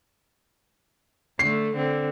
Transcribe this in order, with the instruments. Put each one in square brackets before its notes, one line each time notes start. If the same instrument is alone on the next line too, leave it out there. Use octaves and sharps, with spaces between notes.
[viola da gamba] D3 A3 [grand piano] C7
[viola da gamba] D3 C4